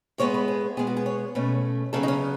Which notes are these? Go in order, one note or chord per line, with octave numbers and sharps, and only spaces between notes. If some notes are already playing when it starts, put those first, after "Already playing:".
A2 G#3 B3 C#5
B4
G#4
B2 G#3 B3 G#4
F#4
G#4
C#5
B2 A3 C#4 B4
C#3 F#3 B3 A4
D#4
C#4